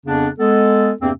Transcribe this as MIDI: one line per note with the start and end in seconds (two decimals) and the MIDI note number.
0.06 0.28 41
0.06 0.28 49
0.06 0.28 59
0.06 0.28 62
0.39 0.92 56
0.39 0.92 59
0.39 0.92 69
1.01 1.11 40
1.01 1.11 43
1.01 1.11 48
1.01 1.11 58
1.01 1.11 60